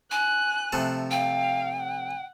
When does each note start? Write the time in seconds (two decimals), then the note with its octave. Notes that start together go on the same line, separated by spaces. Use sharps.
0.11 G#5 F#6
0.72 C3 F3 A3
1.11 F5 G5
1.80 F#5